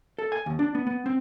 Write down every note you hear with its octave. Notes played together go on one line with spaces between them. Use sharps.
A4
G#5
D#2
D4
B3
B3
C4